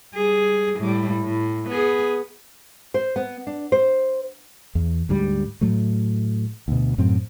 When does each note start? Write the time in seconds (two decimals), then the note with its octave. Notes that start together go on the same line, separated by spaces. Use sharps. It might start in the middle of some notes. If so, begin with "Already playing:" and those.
0.15 G3 G#4
0.78 A2 G3
1.24 A2
1.69 B3 G#4
2.94 C5
3.16 B3
3.47 D4
3.72 C5
4.75 E2
5.09 D2 G#2 G3
5.61 A2 F#3 A3
6.68 D2 B2
6.98 F#2 A2 F#3 C4